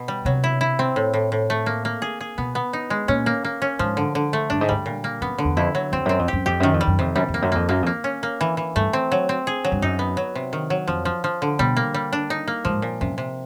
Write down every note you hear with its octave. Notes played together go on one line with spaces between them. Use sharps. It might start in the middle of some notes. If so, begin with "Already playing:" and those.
Already playing: B2
G3
C3 F#3
E4
E4
C4
A2
A2
A2
A3
A#3
A#3
G#4
G#4
B2 B3
B3
D#4
G#3
A#2 C#4
A#3
A#3
C#4
G#2 F3
D3
D3
A3
G2 D4
G#2
G2 G3
A#2
A#3
F#2 B3
D3
E2
F2 E4
F#3
F2 C4
F#2 C4
F2
F#2 G4
F2 G4
F#2 D#3
F2
G3
F#2
F2 C3
F#2 G3
F2
A#3
F#2
F2 A#3
F#2 A#3
F2
A#3
C#4
A#3
E3
E3
G2 A3
C4
F#3
C4
G#4
F#3
G2
F#2 D#4
B3
F#3
C3
D#3
F#3
F2 F3
F3
F3
D3
B2 G3
A#3
G3
D4
D#4
A#3
G#2 F3
A#2
F#2 C3
C3